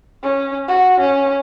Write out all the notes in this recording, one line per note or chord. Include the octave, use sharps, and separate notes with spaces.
C#4
F#4
C#4